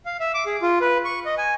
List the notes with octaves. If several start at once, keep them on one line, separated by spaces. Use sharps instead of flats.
F5
E5
D6
G#4
F4
B4
C#6
D#5
G#5